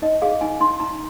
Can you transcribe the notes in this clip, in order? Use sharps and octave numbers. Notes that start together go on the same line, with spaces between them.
D#4 D#5
G#4 F5
D#4 G#5
D#4 C6
D#4 A#5